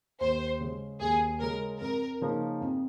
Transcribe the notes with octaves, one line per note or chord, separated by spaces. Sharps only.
D#2 C5
C#3 G#3
D#2 G#4
C#3 G#3 A#4
F2 A#4
C#3 F3 A#3 D#4
F2